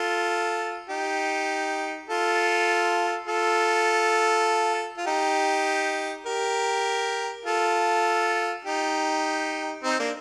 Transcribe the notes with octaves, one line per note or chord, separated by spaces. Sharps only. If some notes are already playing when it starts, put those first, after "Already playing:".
Already playing: F4 A4
D#4 G4
F4 A4
F4 A4
F4
D#4 G4
G4 A#4
F4 A4
D#4 G4
C4 D#4
A#3 D4